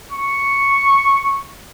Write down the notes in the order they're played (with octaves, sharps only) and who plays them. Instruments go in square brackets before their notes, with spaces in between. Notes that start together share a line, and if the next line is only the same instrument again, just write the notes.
[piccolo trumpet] C#6